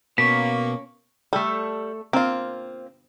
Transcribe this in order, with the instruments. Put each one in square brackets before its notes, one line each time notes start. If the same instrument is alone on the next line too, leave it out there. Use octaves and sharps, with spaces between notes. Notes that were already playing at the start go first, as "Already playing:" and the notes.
[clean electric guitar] B2 [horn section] A#3 [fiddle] C#4 C#6 [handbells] B6
[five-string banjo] G3 [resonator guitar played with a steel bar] A3 A4
[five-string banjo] A#3 F4 [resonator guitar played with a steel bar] C4